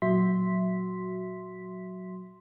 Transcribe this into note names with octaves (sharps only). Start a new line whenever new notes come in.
A#2 F#3 F#4 E5 C6 B6